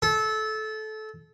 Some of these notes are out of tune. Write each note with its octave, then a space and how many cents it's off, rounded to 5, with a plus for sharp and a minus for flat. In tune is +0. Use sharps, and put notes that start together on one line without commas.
A4 -20